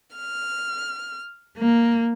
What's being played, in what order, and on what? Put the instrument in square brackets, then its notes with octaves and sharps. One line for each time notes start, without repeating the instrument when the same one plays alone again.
[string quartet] F6
A#3